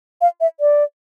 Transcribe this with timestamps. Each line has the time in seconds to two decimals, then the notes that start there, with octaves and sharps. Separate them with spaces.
0.21 F5
0.41 E5
0.60 D5